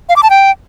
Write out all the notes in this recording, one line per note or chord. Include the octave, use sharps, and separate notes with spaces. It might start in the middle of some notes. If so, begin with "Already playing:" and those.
F5
D6
A5
G5